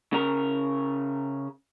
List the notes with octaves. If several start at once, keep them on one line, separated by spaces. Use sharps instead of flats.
C#3 A#4